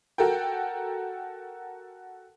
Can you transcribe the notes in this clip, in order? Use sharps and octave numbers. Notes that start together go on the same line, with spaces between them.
F#4 A4 A#4 G5